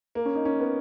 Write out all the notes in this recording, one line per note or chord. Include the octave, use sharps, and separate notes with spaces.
A#3
C#4
D#4
C#4
B3